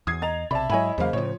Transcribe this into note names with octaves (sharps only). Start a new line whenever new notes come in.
E2 D#6 G#6 C7
D#5 A#5 A6 F7
B1 C3 D5 E5 A5 B5
G#2 F#3 E4 C#5 D#5 G#5 B5
E2 C#3 F#3 A#3 C5 F5
A2 C#3 F3 C#5